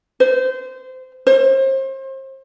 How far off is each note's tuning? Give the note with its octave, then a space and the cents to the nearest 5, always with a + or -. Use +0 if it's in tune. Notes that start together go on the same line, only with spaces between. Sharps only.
C5 -25
C5 +35